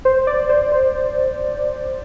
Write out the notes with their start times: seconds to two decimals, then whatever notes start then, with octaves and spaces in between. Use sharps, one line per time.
0.05 C5
0.27 D5
0.49 C5
0.72 C5